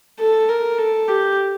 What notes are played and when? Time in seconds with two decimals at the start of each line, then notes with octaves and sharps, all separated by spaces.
0.20 A4
0.49 A#4
0.79 A4
1.08 G4